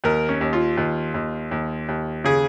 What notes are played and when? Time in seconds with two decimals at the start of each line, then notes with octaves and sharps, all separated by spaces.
0.04 D#2 A#4
0.29 C#4
0.41 D#2
0.53 F4
0.77 D#2
1.14 D#2
1.51 D#2
1.89 D#2
2.24 C#3 G#4